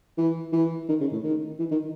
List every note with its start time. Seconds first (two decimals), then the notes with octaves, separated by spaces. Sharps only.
0.18 E3
0.53 E3
0.89 D#3
1.00 C#3
1.12 A2
1.23 D#3
1.59 E3
1.71 D#3